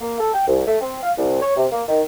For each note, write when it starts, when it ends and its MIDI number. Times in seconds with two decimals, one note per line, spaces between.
0.01 0.19 58
0.20 0.34 69
0.34 0.43 79
0.47 0.62 36
0.67 0.77 57
0.81 0.97 60
1.02 1.12 77
1.18 1.41 36
1.42 1.53 73
1.56 1.66 48
1.72 1.83 58
1.88 2.02 51